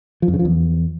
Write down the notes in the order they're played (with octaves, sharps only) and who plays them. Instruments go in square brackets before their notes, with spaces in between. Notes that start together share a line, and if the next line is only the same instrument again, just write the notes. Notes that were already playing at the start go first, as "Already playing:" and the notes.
[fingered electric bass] F3
F2
C#3
F3
E2